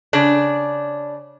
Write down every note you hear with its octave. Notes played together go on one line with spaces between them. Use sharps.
C#3 D4